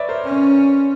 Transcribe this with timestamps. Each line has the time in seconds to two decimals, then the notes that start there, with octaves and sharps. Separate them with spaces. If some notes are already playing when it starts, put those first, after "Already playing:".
Already playing: B4 C#5 D5 E5
0.09 A#4 C5
0.25 C#4